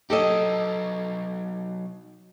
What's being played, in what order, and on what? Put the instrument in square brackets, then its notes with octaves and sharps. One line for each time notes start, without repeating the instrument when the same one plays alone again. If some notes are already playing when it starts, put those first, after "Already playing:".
[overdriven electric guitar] F#3 D#4 [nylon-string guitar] G4 A4 D#5